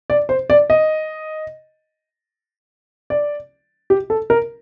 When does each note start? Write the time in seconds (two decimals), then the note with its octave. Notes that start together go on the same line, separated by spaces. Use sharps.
0.10 D5
0.29 C5
0.50 D5
0.70 D#5
3.10 D5
3.90 G4
4.10 A4
4.30 A#4